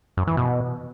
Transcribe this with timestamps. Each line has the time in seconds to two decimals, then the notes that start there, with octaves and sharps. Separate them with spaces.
0.17 F#2
0.27 E3
0.37 B2